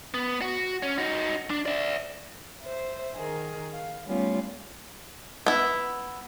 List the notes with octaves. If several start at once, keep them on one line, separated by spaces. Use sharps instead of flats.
B3
F#4
C#4
D#4 F#4
D4
D5 E5
C5 E5
D#3 G#4 A#4
F5
G3 A3 B3 C#4 F4
B3 E4